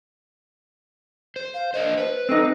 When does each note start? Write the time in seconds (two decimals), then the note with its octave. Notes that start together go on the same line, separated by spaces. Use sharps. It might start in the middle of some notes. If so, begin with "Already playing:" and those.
1.36 C5
1.54 F5
1.74 D4 A#4 C5 D#5
1.98 B4 C5
2.29 C4 D#4 A4